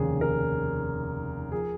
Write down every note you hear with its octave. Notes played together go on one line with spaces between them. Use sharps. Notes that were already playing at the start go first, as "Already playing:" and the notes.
Already playing: F1 D#2 C#3 G#4
A#4
F3 G#4